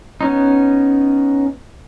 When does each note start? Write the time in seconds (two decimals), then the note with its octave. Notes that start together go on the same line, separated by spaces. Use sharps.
0.21 B3 C#4 D#4